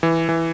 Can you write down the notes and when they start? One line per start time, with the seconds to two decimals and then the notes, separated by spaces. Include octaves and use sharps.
0.03 E3
0.29 E3